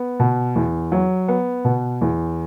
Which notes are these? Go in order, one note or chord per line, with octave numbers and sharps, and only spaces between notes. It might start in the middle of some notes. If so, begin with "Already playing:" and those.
Already playing: B3
B2
E2
F#3
B3
B2
E2